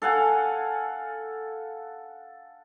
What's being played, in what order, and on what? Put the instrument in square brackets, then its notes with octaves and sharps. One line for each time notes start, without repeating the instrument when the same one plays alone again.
[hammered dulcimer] A4 F5 F#5 G#5